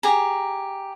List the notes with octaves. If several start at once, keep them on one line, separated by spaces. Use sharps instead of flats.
G4 G#4 A#5